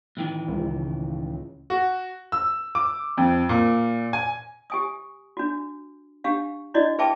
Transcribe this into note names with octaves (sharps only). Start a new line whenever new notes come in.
A2 D#3 E3
C#2
F#4
E6
D6
F2
A#2
G#5
G4 G#5 D#6
D4 F#4
D4 G4 F5
D4 E4 F#4 D5 D#5
G#4 B4 E5 G5 A5 D6